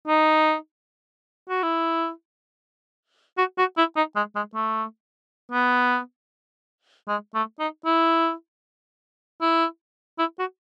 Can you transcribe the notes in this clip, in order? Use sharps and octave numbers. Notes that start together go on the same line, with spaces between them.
D#4
F#4
E4
F#4
F#4
E4
D#4
G#3
G#3
A3
B3
G#3
A3
D#4
E4
E4
E4
F#4